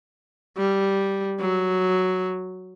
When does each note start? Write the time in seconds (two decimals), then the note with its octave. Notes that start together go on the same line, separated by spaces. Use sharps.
0.57 G3
1.39 F#3